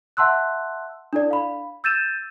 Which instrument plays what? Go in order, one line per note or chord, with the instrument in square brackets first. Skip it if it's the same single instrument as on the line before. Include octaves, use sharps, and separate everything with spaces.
[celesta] E5 F#5 A5 C6 E6 F#6
D4 E4 A4 D5
F5 B5
E6 G6 A6 D#7 E7